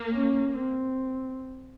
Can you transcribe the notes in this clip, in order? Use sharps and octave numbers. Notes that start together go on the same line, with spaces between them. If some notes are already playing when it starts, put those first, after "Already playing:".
Already playing: A#3
C#4
C4